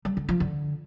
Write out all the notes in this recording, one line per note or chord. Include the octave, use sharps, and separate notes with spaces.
G3
D3
F3
D3